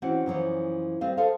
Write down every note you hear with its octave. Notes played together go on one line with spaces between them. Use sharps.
E3 C4 C#4 F#4 F#5
F#2 E3 F3 C#5
G3 C4 D#5 F5
G#4 A4 C5 F5